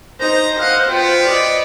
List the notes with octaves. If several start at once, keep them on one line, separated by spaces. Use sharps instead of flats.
D#4 C5 A#5
D#5 F5 F#5
B3 F4 G5
D5 D#5